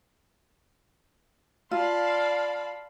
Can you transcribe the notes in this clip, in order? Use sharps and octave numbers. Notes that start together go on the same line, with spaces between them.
F4 D5 F5 A5 B5 C6